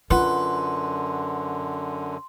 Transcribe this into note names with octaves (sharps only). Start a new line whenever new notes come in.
F#2 D3 F4 B4 F#5 C6